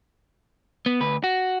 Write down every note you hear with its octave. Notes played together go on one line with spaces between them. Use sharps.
B3
D2 B4
F#4